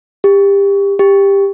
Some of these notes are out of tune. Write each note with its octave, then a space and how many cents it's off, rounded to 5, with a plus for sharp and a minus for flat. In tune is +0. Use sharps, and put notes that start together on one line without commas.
G4 +25
G4 +15